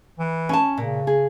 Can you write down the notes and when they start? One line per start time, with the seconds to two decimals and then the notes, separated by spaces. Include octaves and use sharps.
0.19 E3
0.49 C#4 A5
0.78 A#2 C#3
1.07 G#4